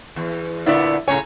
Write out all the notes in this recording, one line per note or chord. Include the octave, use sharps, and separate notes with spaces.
E2
A#2 D3 B3 E4 D5 E5
A2 C#3 C#5 G#5 A#5